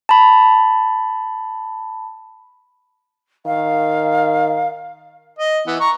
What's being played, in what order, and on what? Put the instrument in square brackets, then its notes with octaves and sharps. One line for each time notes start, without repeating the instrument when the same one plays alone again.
[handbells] A5 B5
[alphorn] D#3 [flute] F5
[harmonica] D#5
E3 B3
A#5 C#6